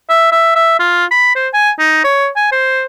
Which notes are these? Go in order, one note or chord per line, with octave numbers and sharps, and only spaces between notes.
E5
E5
E5
F4
B5
C5
G#5
D#4
C#5
G#5
C5